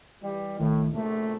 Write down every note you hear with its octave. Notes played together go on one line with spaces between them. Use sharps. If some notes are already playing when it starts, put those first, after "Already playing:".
E3 G3
C2 A2 D#3 F3
A#1 A2 C3 A3 A#3